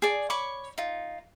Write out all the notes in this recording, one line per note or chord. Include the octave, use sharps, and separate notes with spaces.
G#4 D5
C#5 B5 C#6 D6
D#4 F4